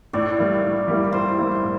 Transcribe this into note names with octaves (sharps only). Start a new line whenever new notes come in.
A2 D5
G3 A#3 E4
A2
G3 A#3 E4
A2 C5
G3 A#3 E4
A2